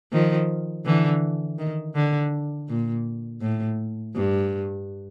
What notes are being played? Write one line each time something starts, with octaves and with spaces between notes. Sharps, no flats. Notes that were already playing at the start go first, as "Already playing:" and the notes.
D#3 F3
D3 E3
D#3
D3
A#2
A2
G2